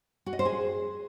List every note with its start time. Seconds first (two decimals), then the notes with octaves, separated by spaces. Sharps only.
0.26 F#4
0.33 D#5
0.39 C5
0.45 G#4